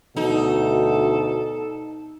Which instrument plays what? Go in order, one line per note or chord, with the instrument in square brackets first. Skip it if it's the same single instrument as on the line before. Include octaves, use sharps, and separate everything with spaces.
[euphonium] D2 [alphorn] B2 [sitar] D#4 [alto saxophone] A4